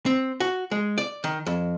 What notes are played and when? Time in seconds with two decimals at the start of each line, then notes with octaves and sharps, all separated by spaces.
0.06 C4
0.40 F#4
0.71 G#3
0.98 D5
1.24 D#3
1.46 F2